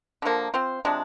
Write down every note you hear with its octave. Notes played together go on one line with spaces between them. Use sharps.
D3 F3 A#3
C4 F4 C5
C3 F3 G#3 D4